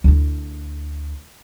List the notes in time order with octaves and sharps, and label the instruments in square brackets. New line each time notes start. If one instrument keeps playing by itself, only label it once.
[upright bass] D2 E4